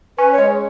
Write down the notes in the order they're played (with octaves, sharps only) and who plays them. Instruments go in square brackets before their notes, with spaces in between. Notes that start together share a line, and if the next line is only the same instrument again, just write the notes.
[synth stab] C#4 [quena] B4
[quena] C#5
[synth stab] G#3